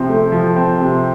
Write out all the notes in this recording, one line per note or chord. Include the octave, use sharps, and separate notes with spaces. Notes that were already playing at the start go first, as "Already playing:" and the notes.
Already playing: C3 F3 C4
A3
F3
C4
C3